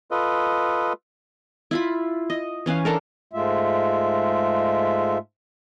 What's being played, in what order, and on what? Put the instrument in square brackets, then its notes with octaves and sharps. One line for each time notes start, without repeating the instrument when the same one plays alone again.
[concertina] F4 A4 B4 D#5
[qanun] E4 F4 B5
D#5
E3 C#4 B4 F5
C#4 D4 A4 A#4
[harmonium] G#2 G#3 A3 F4 E5